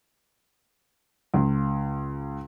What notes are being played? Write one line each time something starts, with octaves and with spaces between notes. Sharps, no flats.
C#2